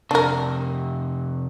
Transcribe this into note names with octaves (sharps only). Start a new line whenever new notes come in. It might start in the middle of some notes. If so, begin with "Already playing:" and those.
F2 C3 D4 A#4